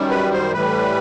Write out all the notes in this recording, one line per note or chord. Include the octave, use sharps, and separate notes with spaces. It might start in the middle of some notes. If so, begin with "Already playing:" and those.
Already playing: F#2 D#3 G3
B4
C5
A2 E3 G3 B4